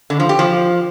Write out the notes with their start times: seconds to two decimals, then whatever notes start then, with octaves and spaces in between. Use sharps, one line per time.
0.10 D3
0.20 F3
0.29 G4
0.39 F3